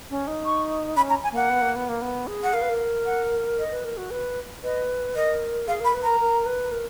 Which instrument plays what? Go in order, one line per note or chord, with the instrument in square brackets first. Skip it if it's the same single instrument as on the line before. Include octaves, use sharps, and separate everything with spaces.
[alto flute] C#4
D#4
[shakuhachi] C#6
[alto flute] C#4 [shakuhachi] B5
[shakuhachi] A#5
G#5
[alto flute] A#3 [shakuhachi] F#5
[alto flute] B3
A#3
B3
A#3
B3
G#4
[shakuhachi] F#5
[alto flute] A#4 [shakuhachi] F5
[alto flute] B4
A#4
[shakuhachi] F#5
D#5
[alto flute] B4
A#4
F#4
B4
[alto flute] B4 [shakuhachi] D#5
[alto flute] A#4 [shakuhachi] D#5
[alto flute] G#4 [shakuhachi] F5
[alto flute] A#4 [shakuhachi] B5
[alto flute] B4
[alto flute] A#4 [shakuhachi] A#5
[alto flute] A#4
B4
A#4